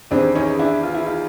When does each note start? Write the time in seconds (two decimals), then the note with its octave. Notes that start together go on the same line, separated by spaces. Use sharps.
0.11 E2 C3 D#3 C4 D4
0.35 C#4 D#4
0.59 D4 E4
0.83 F4
0.94 E4
1.06 D#4 F4